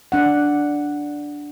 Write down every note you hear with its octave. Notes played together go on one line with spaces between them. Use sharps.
D4 F#5